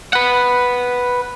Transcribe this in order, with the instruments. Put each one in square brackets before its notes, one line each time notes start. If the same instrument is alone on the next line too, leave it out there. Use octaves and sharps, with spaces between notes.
[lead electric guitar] B4 F#5